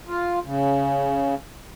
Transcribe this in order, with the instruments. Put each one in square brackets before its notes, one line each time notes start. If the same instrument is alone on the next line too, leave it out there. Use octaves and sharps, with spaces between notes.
[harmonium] F4
C#3